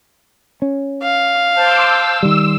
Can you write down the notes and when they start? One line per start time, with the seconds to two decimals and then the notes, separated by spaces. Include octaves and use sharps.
0.62 C#4
1.03 F5
1.56 C5 A5 C6 D6 E6 G6
1.86 E6
2.23 D#3 G3